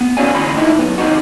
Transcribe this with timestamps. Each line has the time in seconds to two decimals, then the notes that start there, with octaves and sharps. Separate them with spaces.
0.01 B3
0.17 C#4 F#4 C#5 D5 F5 G#5
0.34 D2 E3 G5 B5 C6
0.54 A2 D3 D#4 E4
0.79 F#2 B3
0.98 D#2 G#2 C3 D#4 F#4